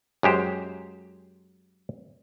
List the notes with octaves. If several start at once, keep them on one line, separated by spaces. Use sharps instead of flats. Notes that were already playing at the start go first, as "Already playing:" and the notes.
F#2 G#3 G4 C5